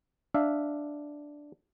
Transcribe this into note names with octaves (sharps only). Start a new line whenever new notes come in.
D4 E5 F5